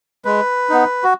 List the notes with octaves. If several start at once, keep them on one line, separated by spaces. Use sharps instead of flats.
G#3 B4
B3 D#4
F#4